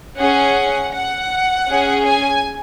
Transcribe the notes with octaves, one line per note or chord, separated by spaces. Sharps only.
C#4 G#4 F#5
F#5
C#4 G#4
G#5